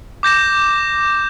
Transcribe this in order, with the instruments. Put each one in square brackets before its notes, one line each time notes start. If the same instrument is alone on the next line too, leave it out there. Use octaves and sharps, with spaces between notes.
[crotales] D6 G6 A#6 E7